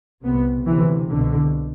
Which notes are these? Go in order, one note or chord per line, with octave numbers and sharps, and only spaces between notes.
C2 C3 B3
D2 C3 E3
C2 B2 D3